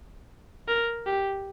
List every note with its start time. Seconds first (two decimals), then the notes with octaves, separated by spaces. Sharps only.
0.68 A#4
1.07 G4